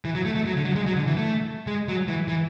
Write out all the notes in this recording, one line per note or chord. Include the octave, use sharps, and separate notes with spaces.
E3
F#3
A3
A3
F#3
D3
F#3
G#3
F#3
D3
E3
A3
G#3
F#3
E3
E3